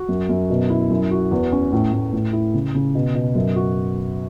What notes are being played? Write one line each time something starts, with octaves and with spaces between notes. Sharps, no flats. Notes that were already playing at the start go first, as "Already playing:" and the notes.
Already playing: F#4
F#2
F#2
B2
E4
F#2
F#4
E2
C#4
A2
A2
A2
E4
C#3
C#3
B2
B2
F#2
F#4